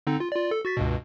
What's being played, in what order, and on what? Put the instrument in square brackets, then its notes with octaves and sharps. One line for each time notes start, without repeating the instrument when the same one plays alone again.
[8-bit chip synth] D3 C4 D#4
F4
F4 D5
A4
F#4 A6 B6
C#2 G2 B2